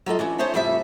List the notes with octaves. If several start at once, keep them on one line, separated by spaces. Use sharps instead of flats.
F#3 F4 A4 D#5
E3 C#4 D4
C#4 D#4 C5 C#5 E5 A5
F2 A2 C#3 G3 G4 E5